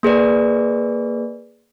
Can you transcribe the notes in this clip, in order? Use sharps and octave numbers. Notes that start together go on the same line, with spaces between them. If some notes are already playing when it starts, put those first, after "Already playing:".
A#3 G#4 B4 D5